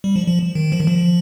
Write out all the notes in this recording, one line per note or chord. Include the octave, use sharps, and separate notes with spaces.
G3
F3
F3
D#3
F3
D#3
F3